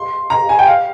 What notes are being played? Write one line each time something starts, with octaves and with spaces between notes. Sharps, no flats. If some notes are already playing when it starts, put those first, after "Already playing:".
Already playing: C6
A#5
G#5
G5
F5